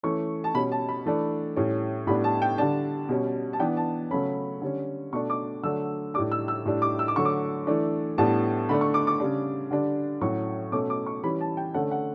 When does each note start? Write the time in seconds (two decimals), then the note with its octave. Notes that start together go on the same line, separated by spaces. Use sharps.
0.03 E3 A3 C#4 C#6
0.44 A5
0.54 B2 G3 C#4 B5
0.72 A5
0.89 B5
1.06 E3 A3 D4
1.56 A2 G3 C#4
2.07 A2 G3 B3 D4 B5
2.24 A5
2.42 G5
2.58 D3 G3 D4 A5
3.09 B2 G3 C#4
3.53 A5
3.60 E3 B3 D4 G5
3.77 A5
4.11 C#3 F#3 A3 C#4 B5
4.62 D3 G3 C#4
5.13 B2 A3 D4 C#6
5.30 D6
5.63 D3 F#3 A3 D4 E6
6.14 A2 G3 D4 D6
6.32 E6
6.48 E6
6.65 A2 G3 D4
6.82 D6
6.99 E6
7.08 D6
7.16 D3 F#3 A3 C#6
7.25 D6
7.67 E3 A3 D4
8.18 A2 G3 B3 D4 A5
8.69 D3 A3 D4 B5
8.81 C#6
8.94 D6
9.07 D6
9.20 C#3 G3 D4
9.71 D3 G3 D4
10.21 A2 F#3 C#4 C#6
10.72 B2 A3 C#4 D6
10.90 D6
11.06 C#6
11.24 E3 G3 C#4 B5
11.41 A5
11.57 G5
11.74 D3 A3 C#4 F#5
11.91 F#5